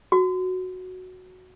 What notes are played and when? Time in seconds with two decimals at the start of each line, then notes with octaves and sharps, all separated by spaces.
0.12 F#4